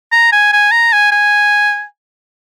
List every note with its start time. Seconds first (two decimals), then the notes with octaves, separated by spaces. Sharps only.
0.12 A#5
0.32 G#5
0.53 G#5
0.72 A#5
0.93 G#5
1.12 G#5